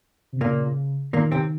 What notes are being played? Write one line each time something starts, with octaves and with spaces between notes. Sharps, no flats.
C3
A#2 C#3 A#3
A#2 D#3 A#3
C3 C4